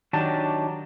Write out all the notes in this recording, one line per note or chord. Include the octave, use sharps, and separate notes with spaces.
D#3 F#3 D4 G4 A5